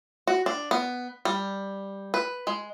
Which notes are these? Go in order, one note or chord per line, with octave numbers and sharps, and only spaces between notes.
F#4
D4
B3
G3
B4
G#3